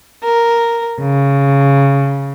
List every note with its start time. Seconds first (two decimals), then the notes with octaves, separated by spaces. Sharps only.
0.24 A#4
1.00 C#3